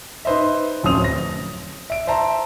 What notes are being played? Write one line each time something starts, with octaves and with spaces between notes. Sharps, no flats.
D#4 B4 C5 D#5 E5
D1 F2 C#4 C5 D#6 F7
A#6
E5 D7
C5 E5 A5 A#5